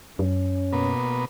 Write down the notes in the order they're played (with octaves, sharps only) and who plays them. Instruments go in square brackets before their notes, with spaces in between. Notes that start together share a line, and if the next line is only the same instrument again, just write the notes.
[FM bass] F#2 [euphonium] C#4
[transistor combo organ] B2 A#3 B3